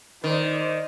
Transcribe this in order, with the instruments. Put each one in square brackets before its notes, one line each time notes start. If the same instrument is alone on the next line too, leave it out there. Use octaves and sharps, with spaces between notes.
[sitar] D#3 [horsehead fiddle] C5 D5